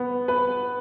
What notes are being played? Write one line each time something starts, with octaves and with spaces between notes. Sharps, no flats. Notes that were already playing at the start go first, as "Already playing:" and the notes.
Already playing: B3
B4